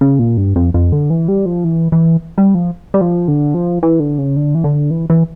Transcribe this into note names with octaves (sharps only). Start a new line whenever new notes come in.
C#3
A#2
G2
F2
F2
D3
E3
G3
F3
E3
E3
G3
F3
G3
F3
D3
F3
E3
D3
C#3
D3
E3
D3
E3
E3